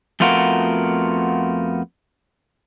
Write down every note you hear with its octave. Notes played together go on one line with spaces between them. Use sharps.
F2 A3 B3 F4 F#4 A#4